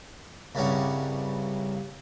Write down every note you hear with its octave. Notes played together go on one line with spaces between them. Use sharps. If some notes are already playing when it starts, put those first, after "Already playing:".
C2 G2 C#3 G3 C#4 F#5